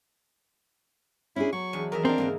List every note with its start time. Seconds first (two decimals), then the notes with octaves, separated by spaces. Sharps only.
1.36 C#4 D4 E4 G#4
1.53 F#3 C#6
1.73 E2 D4 G#5
1.92 E2 D#3 A#4 E5
2.05 C4 D4 A#4
2.18 E2 G#2 D3 A#3